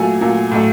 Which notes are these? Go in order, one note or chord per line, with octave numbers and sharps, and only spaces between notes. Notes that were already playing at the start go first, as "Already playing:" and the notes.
Already playing: A#2 F#3 A3 G#5
A#2 F#3 A3
A2 F#3 A3